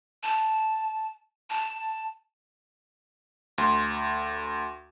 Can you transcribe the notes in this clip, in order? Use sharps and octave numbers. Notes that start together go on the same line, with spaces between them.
A5
A5
D2 C6